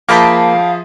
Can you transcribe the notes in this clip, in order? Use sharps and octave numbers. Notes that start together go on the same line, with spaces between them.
F3 A#3 G#4 E5 F5 G5 A5 B5